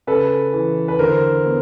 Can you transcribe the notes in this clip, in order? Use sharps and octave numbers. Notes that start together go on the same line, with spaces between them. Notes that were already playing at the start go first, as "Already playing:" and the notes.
C#3 A4 B4
E3
B4
D3 A#4 C5
B3